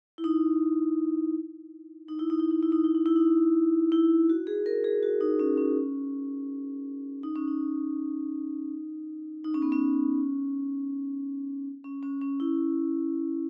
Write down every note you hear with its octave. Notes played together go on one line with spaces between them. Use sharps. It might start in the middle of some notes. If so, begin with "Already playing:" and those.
E4
D#4
D#4
E4
D#4
E4
D#4
E4
D#4
E4
D#4
E4
D#4
E4
F#4
G#4
A#4
G#4
F#4
D#4
C#4
C#4
D#4
C#4
D#4
D#4
C#4
B3
C#4
C#4
C#4
C#4
E4